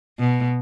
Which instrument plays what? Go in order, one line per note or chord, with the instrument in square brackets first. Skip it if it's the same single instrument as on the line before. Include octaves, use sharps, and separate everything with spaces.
[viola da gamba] B2